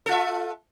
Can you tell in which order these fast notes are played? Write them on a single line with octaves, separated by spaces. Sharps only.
A4 F4 E5